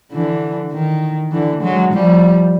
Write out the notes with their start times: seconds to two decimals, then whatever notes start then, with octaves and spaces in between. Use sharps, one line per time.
0.12 D3 E3
0.72 D#3
1.32 D3 E3
1.63 F#3 G#3
1.93 F3 G3